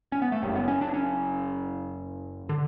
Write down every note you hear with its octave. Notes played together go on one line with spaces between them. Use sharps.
C#4
B3
A3
F#1 F#2 C#3 G3
B3
C#4
D4
C#4
D3